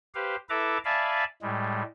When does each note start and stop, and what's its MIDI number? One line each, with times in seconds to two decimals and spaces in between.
0.15 0.36 67
0.15 0.36 71
0.15 0.36 72
0.15 0.36 77
0.49 0.78 64
0.49 0.78 69
0.49 0.78 71
0.49 0.78 76
0.49 0.78 82
0.49 0.78 86
0.85 1.24 74
0.85 1.24 76
0.85 1.24 77
0.85 1.24 80
0.85 1.24 81
0.85 1.24 83
1.42 1.82 45
1.42 1.82 55
1.42 1.82 56